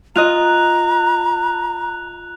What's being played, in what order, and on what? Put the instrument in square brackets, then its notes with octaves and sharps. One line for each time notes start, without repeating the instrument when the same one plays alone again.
[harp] F4 D#5 [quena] A#5 [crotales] F#6 F7